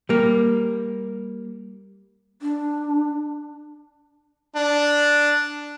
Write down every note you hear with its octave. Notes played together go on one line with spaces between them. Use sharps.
G3 A#3
D4
D4